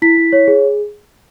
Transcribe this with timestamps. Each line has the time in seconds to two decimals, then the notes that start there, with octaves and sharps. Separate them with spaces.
0.02 E4 B6
0.17 E4
0.33 C#5
0.48 G#4